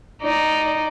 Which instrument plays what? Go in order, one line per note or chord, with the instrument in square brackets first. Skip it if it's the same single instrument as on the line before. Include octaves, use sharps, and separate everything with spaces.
[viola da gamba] D#4 D5